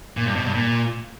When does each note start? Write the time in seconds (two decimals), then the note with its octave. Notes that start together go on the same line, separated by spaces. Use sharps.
0.17 A#2
0.26 G2
0.36 B2
0.45 G2
0.54 A#2